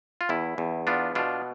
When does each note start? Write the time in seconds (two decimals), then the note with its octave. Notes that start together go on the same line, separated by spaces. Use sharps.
0.21 F4
0.29 E2 E4
0.58 E2
0.87 B3 D4 F4
1.15 B2 D4 F4